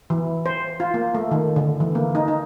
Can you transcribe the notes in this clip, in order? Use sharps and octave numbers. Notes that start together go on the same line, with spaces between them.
E3
C5
F4
A#3
A3
D#3
D3
E3
A#3
D#4
D#4